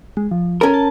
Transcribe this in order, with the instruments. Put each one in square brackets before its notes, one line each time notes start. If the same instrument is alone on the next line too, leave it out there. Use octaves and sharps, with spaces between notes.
[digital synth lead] G#3
F3
[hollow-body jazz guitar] C#4 A#4 [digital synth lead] A4
[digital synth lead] A5